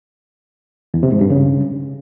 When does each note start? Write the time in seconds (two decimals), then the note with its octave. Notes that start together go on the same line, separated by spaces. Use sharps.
0.94 E2
1.03 C3
1.12 G#2
1.21 G2
1.30 C#3